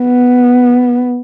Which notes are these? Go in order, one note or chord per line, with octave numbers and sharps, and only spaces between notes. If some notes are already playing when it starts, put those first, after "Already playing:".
Already playing: B3